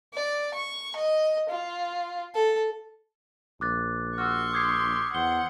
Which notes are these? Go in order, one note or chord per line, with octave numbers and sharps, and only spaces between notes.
D5
C#6
D#5
F4
A4
A#1 D6 F#6 A6
F#4 C6 C#6 E6 F6
G4 D#6 G#6 C7
E2 C5 F#5 G7